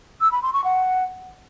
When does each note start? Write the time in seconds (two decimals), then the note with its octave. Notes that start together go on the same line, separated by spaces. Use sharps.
0.21 E6
0.32 B5
0.43 C6
0.53 C#6
0.64 F#5